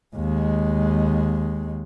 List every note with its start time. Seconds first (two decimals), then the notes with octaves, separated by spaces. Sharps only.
0.16 D#2 G#3